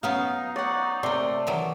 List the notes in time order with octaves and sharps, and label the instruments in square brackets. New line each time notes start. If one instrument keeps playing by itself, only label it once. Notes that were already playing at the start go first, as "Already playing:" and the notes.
[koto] F#3 B3 C#4 [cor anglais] D#4 [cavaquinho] F5
[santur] C#5 [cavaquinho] D5 F#5
[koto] C3 A#3 [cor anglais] A3 [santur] D5 [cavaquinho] C6
[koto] D#3 E3 F#3